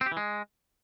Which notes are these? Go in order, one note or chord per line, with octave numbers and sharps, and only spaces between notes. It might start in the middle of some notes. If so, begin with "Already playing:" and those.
C4
G4
E3
G#3